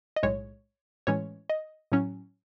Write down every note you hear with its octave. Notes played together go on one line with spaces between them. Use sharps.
D#5
B1 A2 G#3 C#5
A2 E3 G#3 C#4 C#5
D#5
A2 F#3 C#4